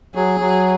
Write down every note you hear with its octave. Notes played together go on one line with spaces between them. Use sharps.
F#3 G#4
F#3